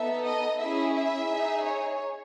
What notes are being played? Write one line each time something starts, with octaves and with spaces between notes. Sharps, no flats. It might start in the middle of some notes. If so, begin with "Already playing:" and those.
Already playing: B3 D#4 A4 E5
D#5
C#4 E4 G#4 E5
E5
D#4 G#4
C#5